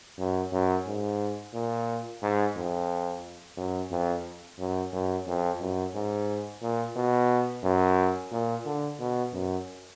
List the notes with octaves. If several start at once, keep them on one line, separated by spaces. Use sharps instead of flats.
F#2
F#2
G#2
A#2
G#2
F2
F#2
F2
F#2
F#2
F2
F#2
G#2
A#2
B2
F#2
A#2
D3
B2
F#2